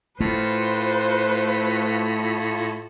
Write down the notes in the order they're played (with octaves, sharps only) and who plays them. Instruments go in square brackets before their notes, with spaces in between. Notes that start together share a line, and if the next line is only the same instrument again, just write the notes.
[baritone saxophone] A2 [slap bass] A3 [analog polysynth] F4 C#7 [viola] B4 C5